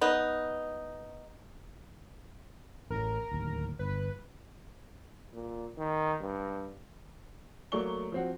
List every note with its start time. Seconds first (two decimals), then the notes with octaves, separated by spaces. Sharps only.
0.01 B3 D#4
2.90 A1 A2 A#4
3.32 D1 D#2
3.79 G1 B4
5.33 A#2
5.78 D#3
6.21 G2
7.72 F#3 A3 A#3 D5 C#6 G7
8.12 F3 C4 F#4